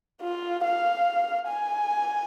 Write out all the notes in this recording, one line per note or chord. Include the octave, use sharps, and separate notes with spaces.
F4
F5
G#5